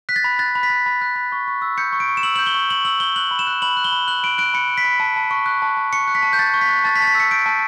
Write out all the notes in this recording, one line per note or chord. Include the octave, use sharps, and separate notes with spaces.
F#6 B6
A6
B5
F#6 A6
B5
B6
F#6
B5
F#6
B5
C#6
C#6
E6
G6 C#7
C#6
D7
C#6
E7
E6 F#7
G6 F#7
G7
C#6
C#6 F#7
E6 F#7
G6 G7
F#6 F#7
B5
E7
F#6
B5 F#7
F#6
G7
B5
F#6 F#7
B5 D7
F#6 D7
B5 C#7
F#6
B6
B5
A5
A5
C#6
F#6
A5
A5
C#6 C#7
F#6
B6
A5
G6
A5 A6
C#6
B6
F#6
A5 A6
B6
A5 A6
B6
E6
C#7
G6 D7
A5